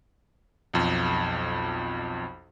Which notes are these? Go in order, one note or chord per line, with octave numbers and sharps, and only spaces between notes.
B1 F2